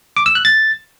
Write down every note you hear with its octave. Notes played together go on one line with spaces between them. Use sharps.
D6
E6
F#6
A6